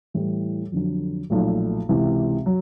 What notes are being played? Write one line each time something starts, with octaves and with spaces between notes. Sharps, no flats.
A2 E3 G3
F2 D3 F#3
B1 A#2 F3 A3
C#2 C3 E3
F#3